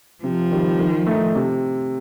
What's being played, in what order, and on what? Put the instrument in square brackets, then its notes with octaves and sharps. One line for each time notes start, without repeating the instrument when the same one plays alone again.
[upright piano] C3 [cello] F3
[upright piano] D#3 G3
D#3
A3 D#4
C3